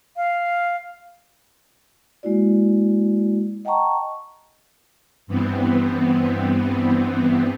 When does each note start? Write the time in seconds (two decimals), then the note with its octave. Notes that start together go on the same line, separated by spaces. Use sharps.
0.17 F5
2.23 G#3 A#3 E4 F#4 D5
3.65 D#5 F#5 G5 A5 A#5 C#6
5.27 G2 E3 B3 C4